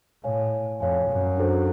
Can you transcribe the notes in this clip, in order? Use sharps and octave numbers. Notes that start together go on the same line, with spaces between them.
A2 C#5 F5 G#5
F2 C#5 F5 G#5
F#2
D4 F#4 A4 C5